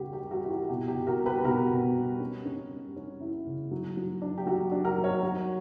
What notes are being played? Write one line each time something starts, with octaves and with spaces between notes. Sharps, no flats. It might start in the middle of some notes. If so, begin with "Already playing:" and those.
Already playing: C#3 G3 F#4 G4
G4
G3
F#4
E4 G4
F#4
B2 G4
G4
B2
F#4 A#4
G3
G4 B4
B2 F#4 A#4
B2
G3
C#4
C#4
G3
C#4
E4
C#3
F#3
F#3
D4
G4
F#3 F#4
D4
F#4 A#4
F#3
A#4 C#5
F#3 F#4